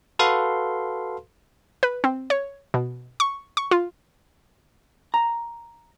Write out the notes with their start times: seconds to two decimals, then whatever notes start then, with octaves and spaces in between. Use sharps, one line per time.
0.19 F#4 A4 B4 F5 C6
1.83 B4
2.04 C4
2.30 C#5
2.74 B2
3.20 C#6
3.57 C#6
3.71 F4
5.14 A#5